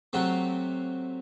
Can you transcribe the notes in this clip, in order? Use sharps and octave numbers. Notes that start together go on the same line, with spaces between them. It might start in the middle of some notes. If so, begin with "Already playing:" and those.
C3 F#3 A3 C4 F#4